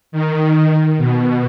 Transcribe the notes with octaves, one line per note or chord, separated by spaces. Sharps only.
D#3
B2